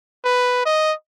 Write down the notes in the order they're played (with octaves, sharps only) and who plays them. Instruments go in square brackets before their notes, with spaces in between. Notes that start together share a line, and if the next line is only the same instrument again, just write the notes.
[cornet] B4
D#5